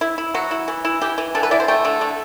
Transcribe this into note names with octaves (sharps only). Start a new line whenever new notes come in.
E4
E4
F#3 F#4
E4
E3
E4
E3 G4
E3
D3 A4
B4
E4 D5
C5
A3 G5
D3
D3